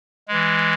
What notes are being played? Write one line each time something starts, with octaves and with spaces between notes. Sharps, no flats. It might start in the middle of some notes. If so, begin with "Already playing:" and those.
E3 G#3